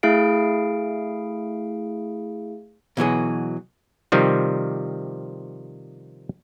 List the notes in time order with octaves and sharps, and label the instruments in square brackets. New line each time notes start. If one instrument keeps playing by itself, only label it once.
[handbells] A3 E4 G#4 F5 D7
[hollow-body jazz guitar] B2 E3 F#3 G#4
[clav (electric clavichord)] C3 D#3 F3 G3